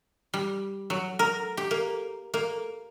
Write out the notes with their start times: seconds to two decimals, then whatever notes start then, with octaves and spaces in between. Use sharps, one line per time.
0.34 G3
0.90 F#3
1.19 A#4
1.57 G4
1.71 A#3
2.34 A#3